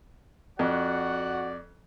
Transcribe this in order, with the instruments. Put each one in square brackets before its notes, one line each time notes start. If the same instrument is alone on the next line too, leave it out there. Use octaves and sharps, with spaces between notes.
[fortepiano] F2 [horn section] F#4 F#5 [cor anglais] D5